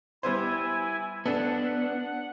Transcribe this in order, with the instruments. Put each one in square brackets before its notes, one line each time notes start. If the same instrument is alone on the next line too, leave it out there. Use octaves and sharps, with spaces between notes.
[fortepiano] G3 B3 C5 [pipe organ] E4 G#5
[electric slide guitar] B3 D4 [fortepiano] A4 [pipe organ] F#5